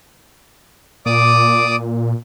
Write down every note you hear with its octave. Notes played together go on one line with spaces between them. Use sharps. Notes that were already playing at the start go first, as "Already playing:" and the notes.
A#2 D5 D6 D#6